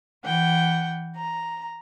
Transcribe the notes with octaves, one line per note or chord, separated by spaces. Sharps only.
E3 F#5 G5
A#5